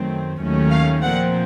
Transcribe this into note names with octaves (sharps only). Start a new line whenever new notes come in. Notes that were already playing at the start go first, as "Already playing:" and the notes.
Already playing: F#2 D#3 F#3 A3 C4
D#2 D#3 F#3 A3 C#4
F5
A#2 F3 C4 F#5